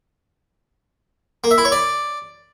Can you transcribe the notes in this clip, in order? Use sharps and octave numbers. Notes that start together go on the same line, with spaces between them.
A#3
E5
E4
C#5
D5